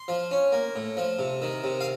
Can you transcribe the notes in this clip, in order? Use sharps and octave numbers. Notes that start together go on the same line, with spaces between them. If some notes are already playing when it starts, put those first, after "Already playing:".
Already playing: C6
F3
C#4
A#3
A2
F3
C3
D#3
C3
F5